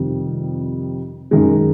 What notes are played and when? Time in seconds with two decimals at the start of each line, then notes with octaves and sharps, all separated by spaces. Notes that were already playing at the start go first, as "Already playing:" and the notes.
Already playing: F2 C3 D#3 G3
1.31 F#2 D#3 G#3